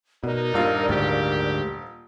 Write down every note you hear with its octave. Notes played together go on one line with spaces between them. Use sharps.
B2 D#4 A#4 D5
D#1 G2 F4
D2 G#2 G4